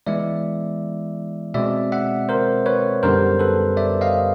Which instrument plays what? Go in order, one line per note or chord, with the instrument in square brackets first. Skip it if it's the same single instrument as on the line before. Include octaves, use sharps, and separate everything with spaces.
[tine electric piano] E3 G#3 B3 E4 D5 E5
B2 G#3 C4 D5 E5
E5 F#5
A#4 C5
B4 C#5
F#2 D3 G3 B3 A#4 C5
A4 B4
D5 E5
D#5 F5